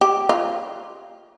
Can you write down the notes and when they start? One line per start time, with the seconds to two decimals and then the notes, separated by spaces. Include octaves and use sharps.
0.01 G4
0.29 F4